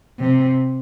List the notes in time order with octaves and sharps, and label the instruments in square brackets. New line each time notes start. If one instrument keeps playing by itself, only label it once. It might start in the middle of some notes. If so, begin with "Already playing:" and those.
[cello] C3